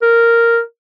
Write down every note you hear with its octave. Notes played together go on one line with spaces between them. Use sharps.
A#4